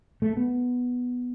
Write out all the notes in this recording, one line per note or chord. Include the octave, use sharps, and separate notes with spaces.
A3
B3